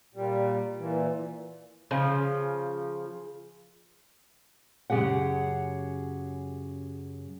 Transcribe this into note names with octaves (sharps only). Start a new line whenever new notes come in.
A#2 G3
A#2 E3
C#3 F3
F#2 C#3 F3 G4 G#4 F#5